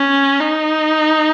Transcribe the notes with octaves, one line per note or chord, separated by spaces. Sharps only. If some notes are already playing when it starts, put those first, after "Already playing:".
Already playing: C#4
D#4